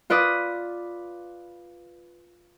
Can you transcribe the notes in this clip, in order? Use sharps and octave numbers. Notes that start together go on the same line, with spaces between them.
F4 B4 D5 D#6